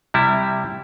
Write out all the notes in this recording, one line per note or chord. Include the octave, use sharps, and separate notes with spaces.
C3 G3 E4